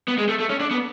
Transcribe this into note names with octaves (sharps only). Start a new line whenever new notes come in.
B3
G#3
A3
A3
C#4
D4
B3